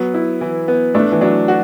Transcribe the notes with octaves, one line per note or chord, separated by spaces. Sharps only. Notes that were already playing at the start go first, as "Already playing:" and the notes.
Already playing: F#3 B3
E4
E3
B3
A3 D4
E3
F#3 D4
F#4